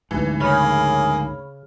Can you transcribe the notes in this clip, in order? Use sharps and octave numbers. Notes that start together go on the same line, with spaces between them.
D2 G#2 E3
C#3 A#3 G#4 C#5 B5 F6